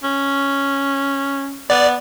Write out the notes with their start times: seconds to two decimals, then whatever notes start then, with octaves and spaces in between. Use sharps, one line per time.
0.03 C#4
1.70 B3 D5